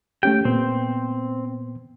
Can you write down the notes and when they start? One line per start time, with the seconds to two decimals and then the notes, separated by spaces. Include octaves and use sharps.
0.23 A3 C#4 G4 G5
0.45 A#2 B3 C4